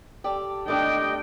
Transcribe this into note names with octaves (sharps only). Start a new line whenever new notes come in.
G4 A4 D5
G3 A3 D4 G4 D#5 G5